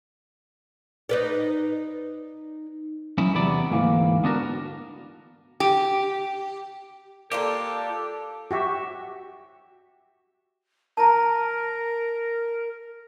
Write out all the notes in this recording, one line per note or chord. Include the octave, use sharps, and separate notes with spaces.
D#4 B4 D5
F#3 C#4 D#4 E4
E2 C3 F#3 B3 D5 B5
D2 G#2 E3 A#3
B3 D4 F#4 A#4
G4
A#3 D4 F4 G4 A4
F#4 G4 E5
A#4 A5 A#5